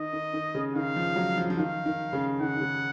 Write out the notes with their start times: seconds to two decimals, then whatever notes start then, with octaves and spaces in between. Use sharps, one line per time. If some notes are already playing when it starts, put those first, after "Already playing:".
Already playing: D#3 D#5
0.13 D#3
0.33 D#3
0.55 C#3
0.75 D#3 F5
0.96 F3
1.16 F#3
1.37 F3
1.50 F3
1.58 D#3 F5
1.86 D#3
2.13 C#3
2.40 D#3 F#5
2.56 D#3
2.61 C#3